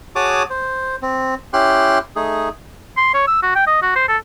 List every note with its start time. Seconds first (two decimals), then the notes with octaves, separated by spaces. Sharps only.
0.16 F#4 G#4 C#5 A5 D6 D#6
0.50 C5
1.02 C4
1.53 C#4 E4 G4 G5 C6 F#6
2.16 A3 D#4 G#4
2.97 C6
3.14 C#5
3.27 E6
3.42 F#4
3.55 G5
3.67 D#5
3.82 F#4
3.95 C5
4.08 A4